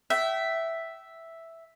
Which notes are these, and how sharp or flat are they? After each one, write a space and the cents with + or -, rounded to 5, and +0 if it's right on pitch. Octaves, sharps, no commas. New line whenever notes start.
E5 +0 G5 -35